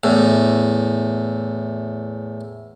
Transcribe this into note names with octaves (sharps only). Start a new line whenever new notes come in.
E2 A2